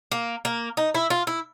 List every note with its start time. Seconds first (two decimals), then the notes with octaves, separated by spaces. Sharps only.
0.12 A#3
0.45 A#3
0.77 D#4
0.95 E4
1.10 F4
1.27 E4